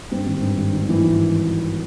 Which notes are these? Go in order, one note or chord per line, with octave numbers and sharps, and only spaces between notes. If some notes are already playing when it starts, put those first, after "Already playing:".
G2 C4
G#1
G2
G#1
G#1
E3
G#1